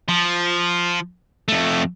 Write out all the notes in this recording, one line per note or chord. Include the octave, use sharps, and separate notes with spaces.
F3
F2 A3